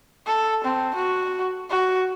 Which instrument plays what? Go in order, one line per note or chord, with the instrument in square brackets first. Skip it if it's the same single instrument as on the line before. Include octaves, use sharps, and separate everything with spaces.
[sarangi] A4
C4
F#4
F#4